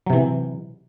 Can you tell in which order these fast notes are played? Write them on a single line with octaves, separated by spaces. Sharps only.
F#3 C3 E3